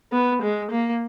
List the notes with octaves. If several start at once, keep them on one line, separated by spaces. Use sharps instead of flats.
B3
G#3
A#3